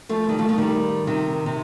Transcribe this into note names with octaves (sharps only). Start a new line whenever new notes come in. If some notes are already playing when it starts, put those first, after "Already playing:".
F3 A3
D#3 G3
F3 A3
F3 A3
D#3 G3
C3 D#3
C3